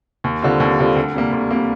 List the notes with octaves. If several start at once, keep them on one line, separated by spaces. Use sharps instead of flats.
D#2
D3 G3 C4 F4
D#2
D3 G3 C4 F4
D2
C3 G3 A#3
D2
C3 G3 A#3